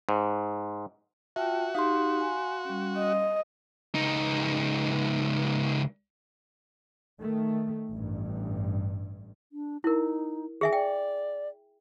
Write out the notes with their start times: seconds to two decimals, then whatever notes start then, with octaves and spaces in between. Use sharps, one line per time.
0.09 G#2
1.36 F4 F#4 E5 G5 A5
1.75 D#4 G4 F5 C6
2.20 G#5
2.65 G3 C#4
2.98 D#5
3.95 C#2 D#4
7.20 D#3 A3
7.90 A1 G2
9.52 D4
9.84 D#4 E4 A#4
10.61 D#3 G#4 E5 G#5
10.73 D5 G5